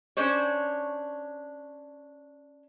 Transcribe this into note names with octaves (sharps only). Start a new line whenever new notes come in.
C#4 D4 C5 C#5